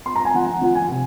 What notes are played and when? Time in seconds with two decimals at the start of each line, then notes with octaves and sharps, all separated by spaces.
0.06 C6
0.16 A#5
0.25 G#5
0.34 F3 F#5
0.61 F3 F#5
0.75 G#5
0.88 C3